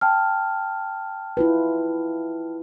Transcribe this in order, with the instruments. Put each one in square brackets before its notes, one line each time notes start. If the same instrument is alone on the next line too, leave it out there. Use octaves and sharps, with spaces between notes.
[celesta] G5 A5 F6
[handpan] E4 F4 B4